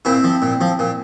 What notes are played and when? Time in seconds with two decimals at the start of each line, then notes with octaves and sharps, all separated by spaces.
0.05 A#2 C4 E4
0.24 F3
0.42 A#2
0.61 F3
0.79 A#2